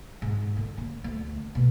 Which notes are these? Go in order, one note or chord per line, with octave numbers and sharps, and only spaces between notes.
G#2
D3
A#3
D2
B2